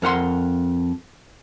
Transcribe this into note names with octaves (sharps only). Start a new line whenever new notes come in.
F2 A#4 F#5 C6